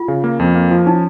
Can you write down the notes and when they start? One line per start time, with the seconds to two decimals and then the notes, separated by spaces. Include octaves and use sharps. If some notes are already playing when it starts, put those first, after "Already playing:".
Already playing: F4
0.08 C#3
0.24 A#3
0.39 F2
0.55 A#3
0.71 F3
0.86 C#4 D#4